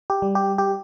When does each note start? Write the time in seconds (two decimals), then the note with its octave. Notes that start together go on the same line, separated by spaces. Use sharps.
0.10 G4
0.22 G3
0.35 G4
0.58 G4